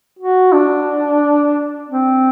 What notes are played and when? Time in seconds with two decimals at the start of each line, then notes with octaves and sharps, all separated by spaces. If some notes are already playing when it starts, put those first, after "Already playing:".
0.19 F#4
0.53 D4
1.89 C4